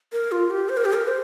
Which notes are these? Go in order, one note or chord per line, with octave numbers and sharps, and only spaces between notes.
A#4
F4
G4
C5
A#4
G4
A#4
C5